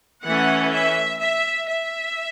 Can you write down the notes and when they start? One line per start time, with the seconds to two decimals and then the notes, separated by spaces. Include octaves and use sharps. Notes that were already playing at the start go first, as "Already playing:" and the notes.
0.23 E3 A3 C#4 F#5
0.72 E5
1.20 E5
1.68 E5